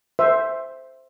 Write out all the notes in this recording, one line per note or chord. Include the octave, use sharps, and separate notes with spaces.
C5 E5